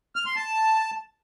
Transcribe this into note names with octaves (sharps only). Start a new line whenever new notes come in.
F6
C6
A5